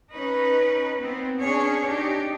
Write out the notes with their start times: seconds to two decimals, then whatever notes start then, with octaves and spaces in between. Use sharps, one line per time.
0.13 C#4 D#4 B4
1.01 B3 C4
1.39 C#4 D4 G#4 C#5
1.88 D4 D#4 G4